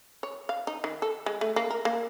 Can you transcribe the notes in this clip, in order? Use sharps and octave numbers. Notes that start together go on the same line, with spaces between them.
C#5
F5
D#4
D#3
A4
G#3
A3
A#3
A#4
A#3